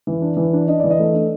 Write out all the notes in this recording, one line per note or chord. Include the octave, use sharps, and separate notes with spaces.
E3
D4
E3
D4
D4 D#5
E3 D5
D#5
A3
D4